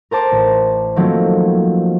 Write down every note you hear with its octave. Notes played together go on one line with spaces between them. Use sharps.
A#4 C5 A5 D6
A1
D#3 F3 F#3 A3 A#3 C4